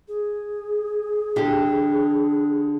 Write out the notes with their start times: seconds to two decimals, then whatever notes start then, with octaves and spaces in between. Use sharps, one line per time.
0.08 G#4
1.36 D3 G4